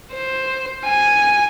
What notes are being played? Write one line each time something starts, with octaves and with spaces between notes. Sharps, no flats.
C5
G#5